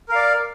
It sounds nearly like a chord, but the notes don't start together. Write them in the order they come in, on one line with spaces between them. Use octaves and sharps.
A#4 F5 D5